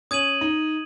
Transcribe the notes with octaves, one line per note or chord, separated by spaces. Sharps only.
C#4 D#6 G#6 D#7 F#7
D#4